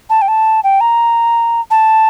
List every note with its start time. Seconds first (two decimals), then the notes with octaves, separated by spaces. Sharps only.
0.10 A5
0.22 G5
0.28 A5
0.64 G5
0.81 A#5
1.71 A5